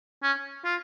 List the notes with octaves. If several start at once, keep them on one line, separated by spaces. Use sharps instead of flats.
C#4
F4